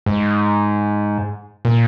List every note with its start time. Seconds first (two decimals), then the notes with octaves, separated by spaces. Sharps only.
0.06 G#2
1.65 A#2